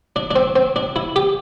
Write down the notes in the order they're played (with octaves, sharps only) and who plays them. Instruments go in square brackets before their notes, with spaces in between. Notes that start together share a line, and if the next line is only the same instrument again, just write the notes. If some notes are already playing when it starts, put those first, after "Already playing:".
[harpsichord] D4
D4
C4
C4
D4
E4
G4